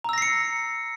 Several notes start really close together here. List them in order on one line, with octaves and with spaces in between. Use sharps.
A#5 E6 A#6 C7 C#7